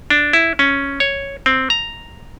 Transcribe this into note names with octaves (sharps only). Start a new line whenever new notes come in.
D4
E4
C#4
C#5
C4
A#5